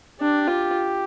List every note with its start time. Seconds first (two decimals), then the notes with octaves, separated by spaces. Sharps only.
0.20 D4 G4
0.48 F4